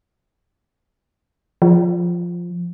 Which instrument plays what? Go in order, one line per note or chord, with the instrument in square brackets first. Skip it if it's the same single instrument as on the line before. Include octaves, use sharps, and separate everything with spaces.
[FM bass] F3